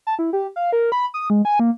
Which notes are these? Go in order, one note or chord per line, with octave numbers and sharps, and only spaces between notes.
A5
E4
G4
F5
A#4
B5
D#6
G#3
G#5
A#3